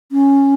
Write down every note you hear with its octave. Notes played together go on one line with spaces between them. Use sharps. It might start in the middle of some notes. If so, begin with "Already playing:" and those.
C#4